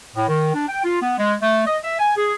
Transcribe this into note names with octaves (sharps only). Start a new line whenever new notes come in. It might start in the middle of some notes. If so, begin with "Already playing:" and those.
A2
D#3
D4
G5
F4
B3
G#3
A3
D#5
E5
G#5
G#4